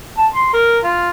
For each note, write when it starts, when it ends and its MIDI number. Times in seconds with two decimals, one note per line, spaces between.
0.18 0.27 81
0.33 0.51 84
0.53 0.79 70
0.84 1.10 65